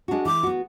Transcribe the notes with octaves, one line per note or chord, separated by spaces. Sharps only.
G#3 D4 F#4
E3 D6
B3 F#4